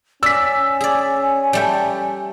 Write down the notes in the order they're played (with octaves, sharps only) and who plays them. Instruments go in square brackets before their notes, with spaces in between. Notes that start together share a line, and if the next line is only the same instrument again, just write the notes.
[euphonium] C#4 [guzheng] D5 [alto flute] G#5 [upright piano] E6 B6
[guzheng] G#4 D5
G3 A3 G5